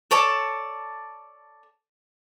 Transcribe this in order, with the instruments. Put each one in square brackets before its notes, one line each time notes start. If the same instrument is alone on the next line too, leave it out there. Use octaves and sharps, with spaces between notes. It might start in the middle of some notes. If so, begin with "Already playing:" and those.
[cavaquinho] A4 C#5 D5 A5